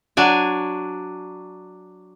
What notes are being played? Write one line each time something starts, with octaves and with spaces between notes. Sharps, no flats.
F#3 D4 G#5